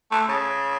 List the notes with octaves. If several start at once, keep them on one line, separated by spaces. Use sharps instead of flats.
A3
C#3